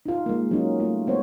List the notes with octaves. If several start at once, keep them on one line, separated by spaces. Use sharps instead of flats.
D#4 F4
G#3 A#3
F#3 C#4 D#4
A3 F4
G#3 B3 C5 C#5